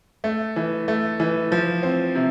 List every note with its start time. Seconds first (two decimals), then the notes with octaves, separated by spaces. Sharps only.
0.24 A3
0.56 E3
0.88 A3
1.20 E3
1.52 F3
1.83 C4
2.15 C3